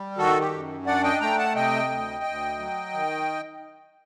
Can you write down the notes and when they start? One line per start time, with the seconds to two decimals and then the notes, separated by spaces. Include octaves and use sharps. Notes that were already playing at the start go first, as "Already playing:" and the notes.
Already playing: G3
0.17 D#3 F#4 A4
0.40 G4
0.52 F#2
0.86 D4 D5 F#5
1.04 D#5 G5
1.20 A3 G5 A#5
1.38 F#5 A5
1.55 C3 D#5 G5
1.90 D2
2.24 D2
2.59 F#3
2.93 D#3